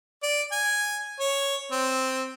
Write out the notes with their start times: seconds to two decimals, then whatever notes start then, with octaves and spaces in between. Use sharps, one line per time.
0.23 D5
0.52 G#5
1.20 C#5
1.72 C4